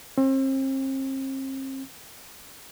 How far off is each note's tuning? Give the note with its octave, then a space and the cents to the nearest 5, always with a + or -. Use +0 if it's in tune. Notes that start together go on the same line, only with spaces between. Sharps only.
C4 +40